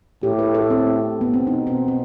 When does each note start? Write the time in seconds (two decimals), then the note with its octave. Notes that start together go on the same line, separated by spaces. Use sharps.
0.23 A2 G4
0.39 B4
0.55 A4
0.70 C4
1.21 B3
1.34 C4
1.47 B2 D#4
1.67 C4
1.88 C4